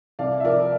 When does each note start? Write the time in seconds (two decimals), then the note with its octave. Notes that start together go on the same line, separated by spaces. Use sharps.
0.19 C2 D5 F5
0.40 E5
0.44 F3 A#4 D5